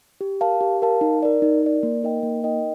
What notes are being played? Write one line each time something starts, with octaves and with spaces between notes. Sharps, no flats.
G4
A#4 F5 A5
G4
A#4 F5 A5
D#4
A#4 D5
D#4
A#4 D5
A#3
D#4 A#4 D#5 G5
A#3
D#4 A#4 D#5 G5